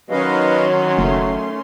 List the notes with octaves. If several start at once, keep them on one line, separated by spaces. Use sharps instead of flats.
D#3 F#3 C#4 B4 D#5 F5 C6
F#1 A3